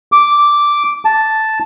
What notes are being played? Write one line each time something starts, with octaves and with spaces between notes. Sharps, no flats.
D6
A5